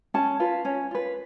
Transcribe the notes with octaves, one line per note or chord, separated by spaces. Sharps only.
C#4 A5
F4 B4
C#4
F4 B4